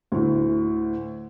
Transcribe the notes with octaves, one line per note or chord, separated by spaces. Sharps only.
D2 A2